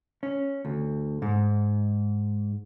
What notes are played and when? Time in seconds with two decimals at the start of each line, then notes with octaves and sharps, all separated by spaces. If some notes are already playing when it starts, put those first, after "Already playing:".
0.23 C#4
0.65 D2
1.22 G#2